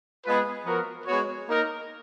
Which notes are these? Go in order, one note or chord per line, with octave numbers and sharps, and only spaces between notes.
G#3 B3 F4 G#4 B4
F3 B3 F#4 A#4
G#3 B3 F#4 C#5
A#3 D#4 A#4